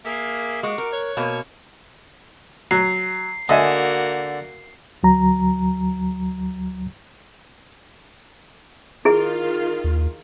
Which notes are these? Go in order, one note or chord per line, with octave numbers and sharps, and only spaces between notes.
A#3 G#4 E5
G#3 F#4 C#6 D6
A#4
C#5 F#6
B2 A#3
F#3 C7
D3 A#3 F#4 D#5 E5 G#5
D2 F#3 A#5
D#3 E4 F4 G#4
D#2